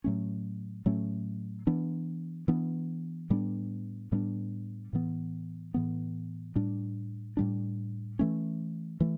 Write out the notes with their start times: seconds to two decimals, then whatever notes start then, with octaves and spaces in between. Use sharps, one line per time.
0.04 A2 F#3 A3 C#4
0.86 A2 F#3 A3 C#4
1.67 E3 B3 D4
2.48 E3 B3 D4
3.30 A2 G3 B3 D4
4.12 A2 G3 B3 D4
4.93 A2 E3 B3
5.74 A2 E3 B3
6.55 A2 G3 D4
7.37 A2 G3 D4
8.19 E3 A3 C#4
9.01 E3 A3